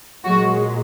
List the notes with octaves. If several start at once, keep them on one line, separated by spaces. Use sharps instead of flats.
A#2 F#3 G#3 F#4